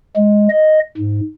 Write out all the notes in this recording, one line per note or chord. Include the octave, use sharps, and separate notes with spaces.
G#3
D#5
G#2